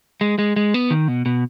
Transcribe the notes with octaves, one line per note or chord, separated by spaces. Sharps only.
G#3
G#3
G#3
B3
D#3
B2
B2